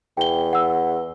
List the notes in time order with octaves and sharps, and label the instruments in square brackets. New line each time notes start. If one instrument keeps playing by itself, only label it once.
[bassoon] E2 [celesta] G5 G7
[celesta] F#5 E6